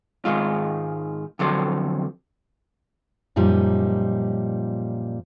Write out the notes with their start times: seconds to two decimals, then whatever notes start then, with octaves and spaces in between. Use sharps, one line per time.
0.25 G#2 D#3 G#3 F4
1.39 F2 D3 F#3 A4 C5
3.36 F#2 A#2 F3 G3 D#4